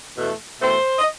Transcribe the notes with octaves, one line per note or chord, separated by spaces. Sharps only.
E2 B2 A3
E2 B2 A3 C5
D#5